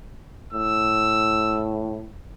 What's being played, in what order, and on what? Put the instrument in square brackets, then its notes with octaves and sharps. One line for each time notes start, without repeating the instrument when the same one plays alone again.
[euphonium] A2 [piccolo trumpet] E6